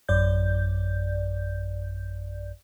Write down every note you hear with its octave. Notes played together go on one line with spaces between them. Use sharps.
A1 F#2 D5 G6